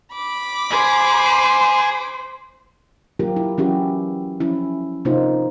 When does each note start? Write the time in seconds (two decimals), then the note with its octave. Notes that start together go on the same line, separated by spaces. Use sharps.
0.12 B5 D6
0.72 G#4 C5
3.20 F#3 A#3 F4 G4 A#4
3.36 E4
3.58 E3 F#3 C#4 E4 F#4 G4
4.40 F3 C#4 E4
5.05 C3 A#3 D#4 F4 C5